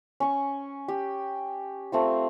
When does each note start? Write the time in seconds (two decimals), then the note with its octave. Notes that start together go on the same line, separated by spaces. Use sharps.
0.20 C#4 C#6
0.88 G4
1.92 A3 C4 F4